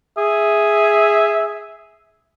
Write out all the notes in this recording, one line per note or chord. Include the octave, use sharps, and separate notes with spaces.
G#4 E5